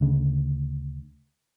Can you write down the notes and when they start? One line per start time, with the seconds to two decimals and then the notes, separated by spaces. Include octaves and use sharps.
0.01 D2 C#3